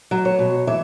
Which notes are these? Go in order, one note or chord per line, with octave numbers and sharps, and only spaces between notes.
F#3
C#5
B2
E3 E5